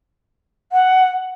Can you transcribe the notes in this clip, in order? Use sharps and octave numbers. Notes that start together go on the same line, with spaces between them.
F#5